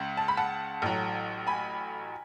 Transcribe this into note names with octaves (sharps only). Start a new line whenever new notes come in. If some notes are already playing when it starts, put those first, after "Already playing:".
Already playing: C#2 C#3
A5
B5
F#5 A5
A1 A2 F#3
G#5 B5